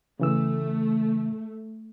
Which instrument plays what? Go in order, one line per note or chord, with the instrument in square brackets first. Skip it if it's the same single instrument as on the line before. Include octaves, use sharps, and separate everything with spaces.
[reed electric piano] C#3 E3 E6 [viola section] A3